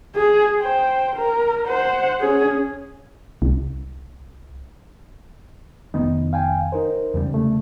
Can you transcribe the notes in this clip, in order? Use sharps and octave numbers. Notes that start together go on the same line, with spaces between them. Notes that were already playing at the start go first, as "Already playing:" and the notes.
G#4
C5 G5
A#4
C5 F#5
C#4 G#4
C2
F1 D#3 B3 D#4
F5 G5 G#5
D#4 A#4 C5
E2 C#3 G3
C3 A3